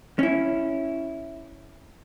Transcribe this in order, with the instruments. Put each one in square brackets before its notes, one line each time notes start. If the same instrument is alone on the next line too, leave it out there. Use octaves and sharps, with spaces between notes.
[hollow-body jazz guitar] C#4 E4